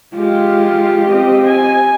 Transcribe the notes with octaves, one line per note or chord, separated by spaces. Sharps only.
G#3 F4 G4
C4 D#5
G#5